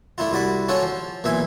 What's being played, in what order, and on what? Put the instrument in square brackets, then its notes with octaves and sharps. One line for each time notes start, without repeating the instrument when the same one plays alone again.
[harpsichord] A3 D4 E4 F4
C2 E4 F#4 D5 B5
C#4 D4 F4 F#4 A4 C#5
F3
B1 A#2 E3 E5 G#5